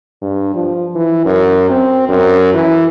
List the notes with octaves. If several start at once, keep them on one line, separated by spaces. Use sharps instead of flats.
G2
F3
E3
F#2
C4
F#2
E3